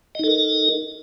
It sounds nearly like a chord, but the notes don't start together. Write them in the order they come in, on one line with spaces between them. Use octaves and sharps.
D#5 D#4 A4 A#4